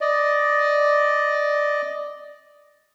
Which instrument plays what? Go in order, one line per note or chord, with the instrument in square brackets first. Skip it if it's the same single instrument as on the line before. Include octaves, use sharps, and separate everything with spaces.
[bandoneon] D5 D#5